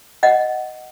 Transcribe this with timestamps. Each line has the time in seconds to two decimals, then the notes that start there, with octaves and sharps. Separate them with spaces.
0.23 D#5 F#5